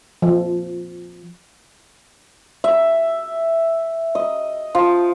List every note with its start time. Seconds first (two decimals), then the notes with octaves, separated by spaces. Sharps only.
0.22 F3
2.64 E5
4.15 D#5
4.75 F3